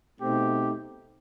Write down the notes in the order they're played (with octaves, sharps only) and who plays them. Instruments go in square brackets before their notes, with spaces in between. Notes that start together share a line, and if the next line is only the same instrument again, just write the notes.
[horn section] B2 A3 C4 D#4 G4